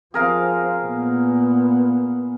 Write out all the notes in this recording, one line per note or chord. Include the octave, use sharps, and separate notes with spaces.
F3 C4 G#4 A#4 F5
A#2 B3